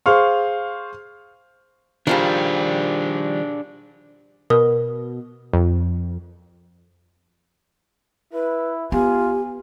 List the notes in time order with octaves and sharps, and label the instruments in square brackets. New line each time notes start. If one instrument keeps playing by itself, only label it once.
[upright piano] G#4 C5 F5 C6 C#6 F6
[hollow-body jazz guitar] D#3 F3 G3 [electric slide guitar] D4 G#4
[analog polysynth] B2 [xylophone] A#4 D#6
[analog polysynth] F2
[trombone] E4 [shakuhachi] B4
[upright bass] B3 [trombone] F4 [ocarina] G4 [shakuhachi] G#5